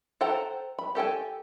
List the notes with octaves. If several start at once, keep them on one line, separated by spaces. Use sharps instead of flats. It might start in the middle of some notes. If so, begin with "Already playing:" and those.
A4 C5 F#5 G5 A#5
B5
G4 A4 G5 G#5